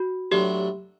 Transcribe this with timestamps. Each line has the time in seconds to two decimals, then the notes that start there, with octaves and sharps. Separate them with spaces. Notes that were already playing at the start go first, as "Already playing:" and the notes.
Already playing: F#4
0.31 A2 F#3 A3 D4 G4